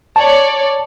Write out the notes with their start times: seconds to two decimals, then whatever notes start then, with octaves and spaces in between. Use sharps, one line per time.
0.16 C#5 D5 A5